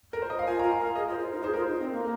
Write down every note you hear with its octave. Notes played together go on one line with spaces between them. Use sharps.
A#4
C5
D#5
F5
F4 G#5
A#5
F4
F5
A#4
G#4 D#5
F4
C5
F4
A#4
D#4
G#4 C5
F4 A#4
C5
D#4
C4
A#3
A#4